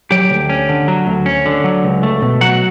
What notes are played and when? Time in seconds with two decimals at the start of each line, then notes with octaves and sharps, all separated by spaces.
0.11 F#3 G4 G5
0.31 D2
0.49 C#4
0.69 D3
0.88 F#3
1.07 D2
1.26 C#4
1.46 D3
1.64 F#3
1.84 C#2
2.03 A3
2.22 B2
2.41 F#3 F#4 F#5